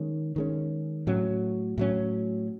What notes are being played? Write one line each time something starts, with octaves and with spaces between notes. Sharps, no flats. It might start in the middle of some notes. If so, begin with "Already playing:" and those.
Already playing: D#3 G#3 C#4
D#3 G#3 C#4
A2 F#3 C#4
A2 F#3 C#4